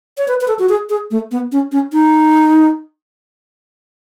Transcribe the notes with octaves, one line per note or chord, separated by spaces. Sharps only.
C#5
B4
B4
A4
F#4
G#4
G#4
A3
B3
C#4
C#4
D#4